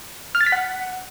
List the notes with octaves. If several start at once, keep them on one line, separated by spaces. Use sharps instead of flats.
F6
A6
B6
F#5